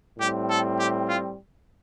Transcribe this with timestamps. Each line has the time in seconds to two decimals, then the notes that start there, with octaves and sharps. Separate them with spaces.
0.18 A2 G3 C4 G4
0.48 A4
0.78 G4
1.07 F4